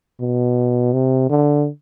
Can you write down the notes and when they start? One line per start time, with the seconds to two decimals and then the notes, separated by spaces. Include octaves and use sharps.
0.21 B2
0.93 C3
1.30 D3